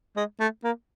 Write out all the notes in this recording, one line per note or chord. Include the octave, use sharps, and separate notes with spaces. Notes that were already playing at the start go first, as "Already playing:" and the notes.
G#3
A3
A#3